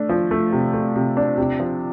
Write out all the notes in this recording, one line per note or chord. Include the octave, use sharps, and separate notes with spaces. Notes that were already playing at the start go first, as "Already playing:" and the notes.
Already playing: A3 D4
F3
A3
C3
A3
C3
D4
C3
F3